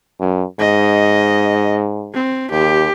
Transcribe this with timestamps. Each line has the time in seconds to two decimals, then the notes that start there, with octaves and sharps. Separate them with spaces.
0.20 F#2
0.60 G#2 D#5
2.13 C4
2.51 D#2 G4